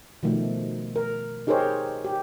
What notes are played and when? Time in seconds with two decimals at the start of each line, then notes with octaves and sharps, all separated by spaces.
0.23 B2 D#3 F3 A3
0.96 A#4
1.47 D#4 G4 G#4 A#4 C5 C#5
2.05 G4